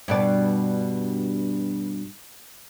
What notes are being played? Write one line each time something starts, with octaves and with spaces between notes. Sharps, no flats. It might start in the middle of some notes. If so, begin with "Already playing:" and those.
G2 B2 D5